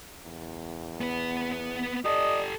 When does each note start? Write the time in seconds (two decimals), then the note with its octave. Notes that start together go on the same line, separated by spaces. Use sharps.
0.22 E2
1.01 B3 B4
2.05 G4 A4 D5 D#5